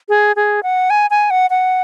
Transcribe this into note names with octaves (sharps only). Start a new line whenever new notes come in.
G#4
G#4
F#5
G#5
G#5
F#5
F#5